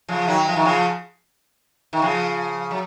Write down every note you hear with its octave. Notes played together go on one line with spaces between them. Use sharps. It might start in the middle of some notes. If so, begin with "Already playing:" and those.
C#3 F3
D#3 F#3
F3
D#3
C#3 F3
D#3
C#3 F3
F#3